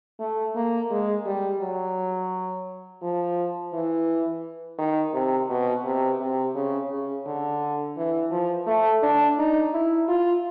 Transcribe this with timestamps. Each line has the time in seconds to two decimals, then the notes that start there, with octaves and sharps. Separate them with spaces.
0.20 A3
0.55 A#3
0.90 G#3
1.26 G3
1.61 F#3
3.02 F3
3.73 E3
4.79 D#3
5.13 C3
5.50 B2
5.84 C3
6.20 C3
6.55 C#3
6.91 C#3
7.26 D3
7.97 E3
8.31 F3
8.67 A3
9.03 D4
9.38 D#4
9.73 E4
10.09 F4